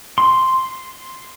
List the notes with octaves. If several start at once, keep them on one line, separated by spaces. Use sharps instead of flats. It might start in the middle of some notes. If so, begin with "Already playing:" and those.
C6